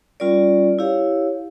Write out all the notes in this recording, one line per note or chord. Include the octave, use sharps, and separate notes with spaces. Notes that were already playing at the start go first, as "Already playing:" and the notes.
G3 C#4 F4 A#4 D5
E4 G4 C#5 F5